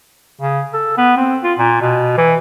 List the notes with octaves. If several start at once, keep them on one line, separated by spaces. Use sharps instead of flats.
C#3
A4
B3
C4
F4
A#2
B2
E3